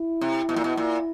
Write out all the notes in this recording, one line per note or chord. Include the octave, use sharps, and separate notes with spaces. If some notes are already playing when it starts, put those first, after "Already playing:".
Already playing: E4
C3
B2
A#2
B2
A#2